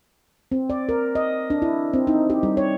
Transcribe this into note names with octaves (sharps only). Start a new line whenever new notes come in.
C4
D5
A#4
D#5
D4
E4
C4
D#4
G4
G3
C#5